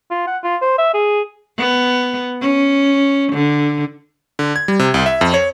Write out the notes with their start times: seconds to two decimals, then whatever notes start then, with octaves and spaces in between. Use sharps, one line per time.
0.11 F4
0.27 F#5
0.44 F4
0.62 C5
0.78 E5
0.94 G#4
1.58 B3
2.41 C#4
3.32 D3
4.39 D3
4.56 G#6
4.68 G3
4.79 C3
4.94 C2
5.06 E5
5.21 F2
5.34 C#5